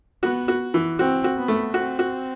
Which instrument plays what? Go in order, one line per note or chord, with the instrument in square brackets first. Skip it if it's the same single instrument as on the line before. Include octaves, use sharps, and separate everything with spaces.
[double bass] B3 [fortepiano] F#4
[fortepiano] F#4
E3
[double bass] C4 [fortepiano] F#4
[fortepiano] F#4
[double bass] B3
[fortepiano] A3
[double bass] C4 [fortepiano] F#4
[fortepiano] F#4